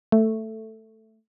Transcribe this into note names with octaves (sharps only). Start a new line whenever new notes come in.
A3